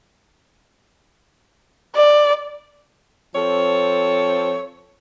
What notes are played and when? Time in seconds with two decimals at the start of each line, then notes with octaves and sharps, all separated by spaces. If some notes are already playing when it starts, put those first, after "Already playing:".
1.95 D5
3.35 F3 C4 A4 C#5